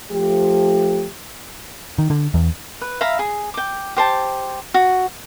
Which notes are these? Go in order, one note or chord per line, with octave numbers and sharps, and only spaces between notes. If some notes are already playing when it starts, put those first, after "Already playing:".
F3 A3 G4
D#3
D3
E2
B4
E5 F5 A#5 B5
G#4
G5 D6
G4 C5 A5
F#4